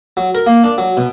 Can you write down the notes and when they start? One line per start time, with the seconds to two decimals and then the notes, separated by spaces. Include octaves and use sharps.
0.17 F#3
0.35 A#4
0.47 A#3
0.64 D4
0.78 F#3
0.97 B2